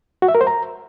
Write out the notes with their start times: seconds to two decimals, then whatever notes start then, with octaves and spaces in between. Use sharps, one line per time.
0.22 F#4
0.28 E5
0.35 A#4
0.41 C5
0.47 A#5